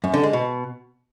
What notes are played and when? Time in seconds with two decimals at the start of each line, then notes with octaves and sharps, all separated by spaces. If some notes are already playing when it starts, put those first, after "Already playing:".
0.04 F#2
0.14 D3
0.23 G#3
0.33 B2